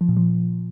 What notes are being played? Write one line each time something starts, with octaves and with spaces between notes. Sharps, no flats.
F3
A#2
F3